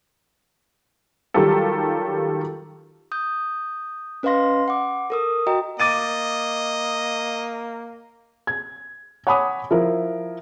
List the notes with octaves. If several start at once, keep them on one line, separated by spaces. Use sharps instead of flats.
D#3 F#3 G3 F4 G4 A4
D#6 G6
C#4 B4 D#5 F5 C6 A#6
F#5 D6
A4 A#4 D#6
F#4 D#5 G5 A#5
A#3 D#5 D6 A6 D#7
G#6
C#5 F#5 G#5 B5 D6 D#6
F3 E4 A#4